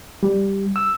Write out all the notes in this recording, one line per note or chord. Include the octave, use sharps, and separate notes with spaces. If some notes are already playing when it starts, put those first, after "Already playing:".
G3
E6